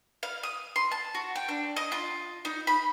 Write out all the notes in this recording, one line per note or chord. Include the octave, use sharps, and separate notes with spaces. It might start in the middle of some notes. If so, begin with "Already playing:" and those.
F5
D#6
C6
A5
F#4
G5
D4
D#5
F4
D#4
B5